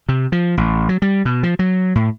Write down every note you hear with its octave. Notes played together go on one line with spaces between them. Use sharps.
C3
F3
A1
F#3
G3
B2
F3
F#3
A2